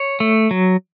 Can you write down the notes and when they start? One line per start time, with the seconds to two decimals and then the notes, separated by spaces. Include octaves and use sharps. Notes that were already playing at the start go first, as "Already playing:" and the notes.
Already playing: C#5
0.20 A3
0.51 F#3